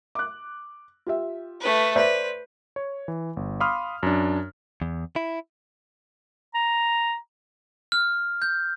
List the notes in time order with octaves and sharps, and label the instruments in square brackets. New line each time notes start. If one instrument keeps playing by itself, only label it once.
[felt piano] D6 F#6
F4 G4 E5
[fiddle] A3 B4
[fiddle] B4 [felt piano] C5 D5 E5
[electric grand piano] C#5
E3
G1
F5 B5 C6 D6 D#6 F6
F#2 D4
[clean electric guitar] E2
E4
[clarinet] A#5
[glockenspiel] F6
G6